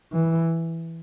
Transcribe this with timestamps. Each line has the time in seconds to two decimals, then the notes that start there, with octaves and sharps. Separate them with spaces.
0.13 E3